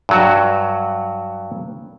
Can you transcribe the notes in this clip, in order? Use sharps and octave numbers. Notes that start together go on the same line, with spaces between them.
G2 F#3 F#4